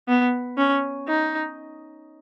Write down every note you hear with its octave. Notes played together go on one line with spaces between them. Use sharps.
B3
C#4
D#4